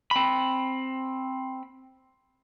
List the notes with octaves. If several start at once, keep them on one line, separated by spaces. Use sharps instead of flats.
C4 B5